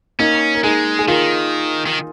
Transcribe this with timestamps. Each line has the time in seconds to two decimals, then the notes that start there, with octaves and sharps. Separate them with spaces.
0.19 A#3 C#4 D#4
0.55 A#4
0.64 G#3 D#4 G#4
0.99 G#4
1.08 D#3 F4 A#4
1.86 D#3